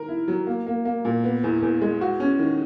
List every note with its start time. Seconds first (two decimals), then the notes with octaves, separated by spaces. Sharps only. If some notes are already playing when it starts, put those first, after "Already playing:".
Already playing: D#3 A#4
0.08 E4
0.28 F#3
0.47 A#3
0.67 A#3
0.85 A#3
1.05 A#2
1.24 B3
1.44 E2
1.62 E2
1.82 G#3
2.01 F#4
2.20 C#4
2.39 D#3